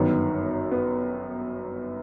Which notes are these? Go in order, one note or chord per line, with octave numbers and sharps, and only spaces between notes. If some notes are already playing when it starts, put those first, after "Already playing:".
Already playing: G1 F#2 D#3 B3
B3